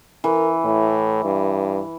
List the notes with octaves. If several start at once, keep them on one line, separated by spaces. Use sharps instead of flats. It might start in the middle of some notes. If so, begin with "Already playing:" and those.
E3 A#4
A2
G2